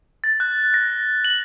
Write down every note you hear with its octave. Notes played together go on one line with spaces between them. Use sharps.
A6
F#6
A#6
F#7